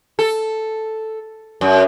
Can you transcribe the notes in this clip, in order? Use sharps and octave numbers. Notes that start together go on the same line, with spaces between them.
A4
F#2